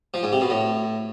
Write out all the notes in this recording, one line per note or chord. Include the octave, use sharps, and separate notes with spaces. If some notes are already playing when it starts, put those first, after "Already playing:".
F3
G#2
C3
B2
A2